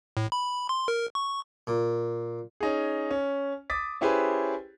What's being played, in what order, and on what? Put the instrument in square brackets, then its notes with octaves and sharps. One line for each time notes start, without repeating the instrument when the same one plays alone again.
[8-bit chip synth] A2
B5
C6
A#4
C#6
[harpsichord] A#2
[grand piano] C#4 D#4 G#4
C#4
D6 D#6 A6 B6
C#4 E4 G4 G#4 B4 C5